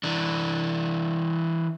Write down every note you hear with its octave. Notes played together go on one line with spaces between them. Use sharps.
E3 D4